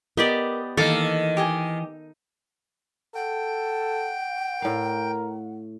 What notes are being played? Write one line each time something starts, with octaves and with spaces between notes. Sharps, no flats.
B3 G4 A#4 D5 D#5
D#3 E3 A#3 A4 F5 D6
G4 D#5 G#5
A4 F#5 G5
A2 A#4 F5